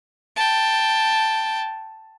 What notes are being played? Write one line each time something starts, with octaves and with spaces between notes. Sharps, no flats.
G5 A5